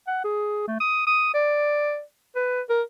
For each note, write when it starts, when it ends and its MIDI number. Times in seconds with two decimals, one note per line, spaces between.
0.07 0.21 78
0.24 0.66 68
0.68 0.77 57
0.80 1.02 87
1.07 1.30 87
1.34 2.01 74
2.36 2.61 71
2.69 2.82 70